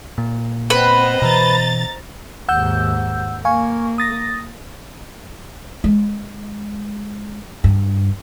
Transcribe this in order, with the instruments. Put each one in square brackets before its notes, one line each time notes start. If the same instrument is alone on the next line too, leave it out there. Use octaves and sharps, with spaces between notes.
[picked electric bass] A#2
[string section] B3 C4 [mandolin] B4 [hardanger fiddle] C5 D#5
[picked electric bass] B2 E3 [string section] A#5 A6
[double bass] D#2 G#2 [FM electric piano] F#5 E6 G6
[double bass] A#3 [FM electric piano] F5 G#5 C#6
[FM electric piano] D#6 A6 A#6
[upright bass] G#3
G2